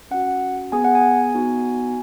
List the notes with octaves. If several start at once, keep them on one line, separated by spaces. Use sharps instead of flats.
C#4 F#4 F#5
B3 G#4 G#5
F#5
G#5
B3 D#4 F#4